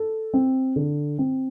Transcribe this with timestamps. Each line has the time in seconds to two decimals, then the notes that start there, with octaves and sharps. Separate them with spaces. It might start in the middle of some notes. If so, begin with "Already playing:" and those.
Already playing: A4
0.34 C4
0.76 D3
1.19 C4